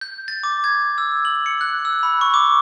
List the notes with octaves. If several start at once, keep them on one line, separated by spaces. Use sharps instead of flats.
G6
A6
D6
G#6
E6
F#7
C#7
F#6
E6
B5
C#6
D6